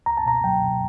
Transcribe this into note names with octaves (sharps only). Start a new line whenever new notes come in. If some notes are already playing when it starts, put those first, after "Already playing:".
C#2 A#5
A5
B2 A#5
F#3 G5
B2